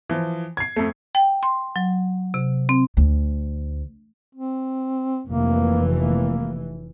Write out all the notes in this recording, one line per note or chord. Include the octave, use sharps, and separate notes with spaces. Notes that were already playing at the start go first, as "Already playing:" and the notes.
E3 F3
G#6 C7
F2 A3
G5
C6
F#3
C3
C4
D2
C4
F1 E3 A#3
A#3